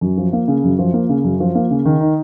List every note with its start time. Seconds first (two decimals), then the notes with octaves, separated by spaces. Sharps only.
0.01 F#2
0.17 F3
0.33 A#3
0.48 C#3
0.64 F#2
0.79 F3
0.93 A#3
1.09 C#3
1.24 F#2
1.40 F3
1.55 A#3
1.71 C#3
1.86 D#3
2.01 D#4